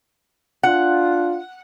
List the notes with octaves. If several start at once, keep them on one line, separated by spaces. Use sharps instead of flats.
D4 F4 F#5